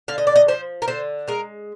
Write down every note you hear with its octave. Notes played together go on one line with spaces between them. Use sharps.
D3 F5
D#5
D5
D#5
F3 C5
A#4
D3 C5
G#3 A#4